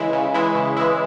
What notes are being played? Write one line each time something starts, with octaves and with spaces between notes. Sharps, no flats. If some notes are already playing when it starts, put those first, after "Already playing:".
Already playing: C#3 E3 G#3 E4
C#3
E3 G#3 E4
C#3
E3 G#3 E4